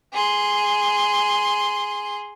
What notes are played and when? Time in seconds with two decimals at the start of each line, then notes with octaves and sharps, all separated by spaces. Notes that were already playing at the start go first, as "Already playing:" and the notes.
0.13 G#4 C6